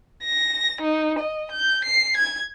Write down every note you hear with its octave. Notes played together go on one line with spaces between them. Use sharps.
A#6
D#4
D#5
G6
C7
G#6